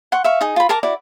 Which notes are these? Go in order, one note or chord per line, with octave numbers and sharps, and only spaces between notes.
F#5 C6 C#6
E5 F5 C#6
D#4 G#4
F4 B5
A#4 A5 A#5 D6
E4 F#4 D5